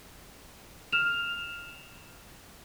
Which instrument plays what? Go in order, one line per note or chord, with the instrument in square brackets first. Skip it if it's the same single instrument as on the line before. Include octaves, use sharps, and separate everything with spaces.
[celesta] F6 E7 F7